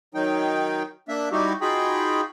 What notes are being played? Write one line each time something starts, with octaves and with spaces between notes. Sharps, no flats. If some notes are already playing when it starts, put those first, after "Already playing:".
D#3 F#3 D#4 G5
A#3 D4 E5
G3 D#4 E4 F#4 G4
D#4 F4 F#4 G#4 G5 B5